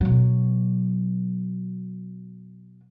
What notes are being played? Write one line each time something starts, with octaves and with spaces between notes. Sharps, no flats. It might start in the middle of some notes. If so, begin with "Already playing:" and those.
B2 F#3